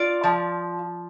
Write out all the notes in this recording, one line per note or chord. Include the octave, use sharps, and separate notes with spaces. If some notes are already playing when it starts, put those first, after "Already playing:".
Already playing: F4 D5
F3